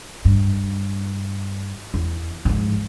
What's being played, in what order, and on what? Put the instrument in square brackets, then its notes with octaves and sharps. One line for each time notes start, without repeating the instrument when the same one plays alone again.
[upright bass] G2
E2
G#2 F3